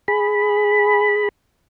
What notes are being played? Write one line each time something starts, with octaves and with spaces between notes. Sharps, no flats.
G#4 B5